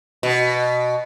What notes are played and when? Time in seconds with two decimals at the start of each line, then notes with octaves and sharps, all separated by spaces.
0.23 B2